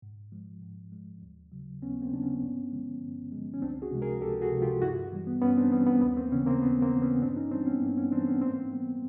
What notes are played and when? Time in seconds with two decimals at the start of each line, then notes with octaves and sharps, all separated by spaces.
0.02 G#2
0.32 F3 G#3
0.62 G#2
0.92 F3 G#3
1.22 D#2
1.52 C#3 F#3
1.82 D#2 B3 C#4
2.01 A#3 C4
2.12 C#3 F#3 D4
2.22 B3 C#4
2.42 G2
2.72 D3 F3 G#3
3.02 G2
3.32 D3 F3 G#3
3.54 C#4
3.62 C#2 C4 D4
3.82 F#4 G#4
3.92 C3 F3 G#3
4.02 G#4 A#4
4.21 C#2 G4 A4
4.42 F#4 G#4
4.52 C3 F3 G#3
4.62 F4 G4
4.82 G2 E4 F#4
5.12 E3 G3
5.27 B3
5.42 G2 B3 C#4
5.57 C4 D4
5.72 E3 G3 B3 C#4
5.86 B3
5.97 A#3
6.01 D#2 B3
6.16 A#3 C4
6.32 C#3 E3 B3 C#4
6.46 A#3 C4
6.62 D#2 B3
6.82 A#3 C4
6.92 C#3 E3
7.02 B3 C#4
7.22 G2 C4 D4
7.36 C#4 D#4
7.51 E3 G3 C4 D4
7.66 B3 C#4
7.82 G2 A#3 C4
7.97 B3 C#4
8.12 E3 C4 D4
8.16 G3
8.27 B3 C#4
8.42 G#2 A#3 C4
8.72 E3 G3 B3